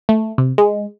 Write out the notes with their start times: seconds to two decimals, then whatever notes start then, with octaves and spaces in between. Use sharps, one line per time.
0.09 A3
0.38 C3
0.58 G#3